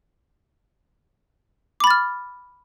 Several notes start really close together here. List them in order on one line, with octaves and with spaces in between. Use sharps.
D6 B5 A6 F6